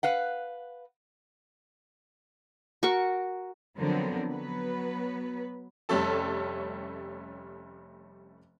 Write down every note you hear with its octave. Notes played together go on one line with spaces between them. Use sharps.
B4 F5 F#5
F#4 A#4 C#6
D3 F3 F#3 B3 C4 A#4
F#3 B3 B4
F1 G3 A3 C#4 A4 A5